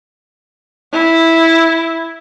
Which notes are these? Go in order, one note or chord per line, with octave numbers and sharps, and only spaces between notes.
E4